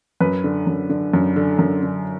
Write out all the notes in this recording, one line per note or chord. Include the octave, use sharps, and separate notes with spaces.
F#2 B4
D3
F#2
D3
F#2
D3
F#2
D3